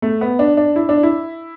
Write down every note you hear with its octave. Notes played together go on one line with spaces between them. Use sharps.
A3
B3
D4
D4
E4
D4
E4